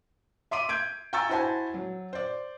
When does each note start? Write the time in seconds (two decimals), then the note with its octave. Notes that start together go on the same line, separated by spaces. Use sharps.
0.51 E5 C6 D6 D#7
0.69 G6 G#6 D7
1.13 G5 G#5 A#5 C#6 E6 A6
1.29 E4 F#4 C5 G#5 A5
1.74 F#3
2.13 C5 D5